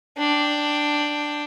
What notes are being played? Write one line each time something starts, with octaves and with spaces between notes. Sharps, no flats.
D4 G5